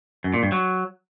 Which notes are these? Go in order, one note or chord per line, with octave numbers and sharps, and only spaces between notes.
F#2
A#2
G2
F#3